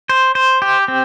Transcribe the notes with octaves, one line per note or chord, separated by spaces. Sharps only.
C5
C5
G4
C4